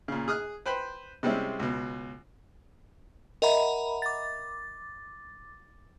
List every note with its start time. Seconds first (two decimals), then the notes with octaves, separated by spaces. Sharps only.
0.08 A#2 C#3
0.28 G#4 D#6 F6 F#6
0.66 B4 C5 G5 B5
1.23 C3 G3 G#3 C4 C#4 E4
1.60 C#2 B2
3.42 A#4 D#5 E5 F#5 A#5 B5
4.02 D6 A6